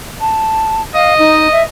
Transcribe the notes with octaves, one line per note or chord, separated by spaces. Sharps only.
A5
D#5 F5
D#4
E5